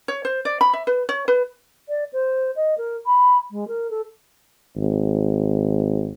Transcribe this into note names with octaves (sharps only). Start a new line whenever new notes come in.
C#5
C5
D5
B5
E5
B4
C#5
B4
D5
C5
D#5
A#4
B5
G#3
A#4
A4
G#1